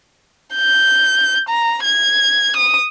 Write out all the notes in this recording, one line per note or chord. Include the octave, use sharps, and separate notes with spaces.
G6
A#5
G#6
D#6